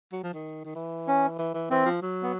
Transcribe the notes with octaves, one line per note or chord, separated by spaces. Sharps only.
F#3
F3
D#3
D#3
E3
C#4
E3
E3
E3 C4
F3
F#3
B3